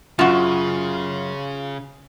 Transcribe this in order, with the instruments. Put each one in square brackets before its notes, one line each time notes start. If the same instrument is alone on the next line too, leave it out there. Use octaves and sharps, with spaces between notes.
[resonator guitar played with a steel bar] F#2 [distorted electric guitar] C#3 [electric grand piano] F4 [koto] F#4 A5